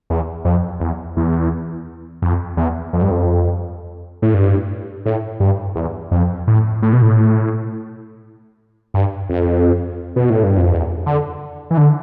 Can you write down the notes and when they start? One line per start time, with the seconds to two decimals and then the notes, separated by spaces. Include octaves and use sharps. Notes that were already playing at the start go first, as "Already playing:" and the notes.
0.10 E2
0.45 F2
0.80 E2
1.17 E2
2.22 F2
2.57 E2
2.93 F2
3.02 G2
3.11 F2
4.22 A2
4.34 G2
5.06 A2
5.40 G2
5.76 E2
6.11 F2
6.47 A2
6.82 A2
6.93 B2
7.02 A2
8.94 G2
9.30 F2
10.16 B2
10.30 A2
10.43 G2
10.58 F2
10.71 E2
11.06 D3
11.71 E3
11.77 D3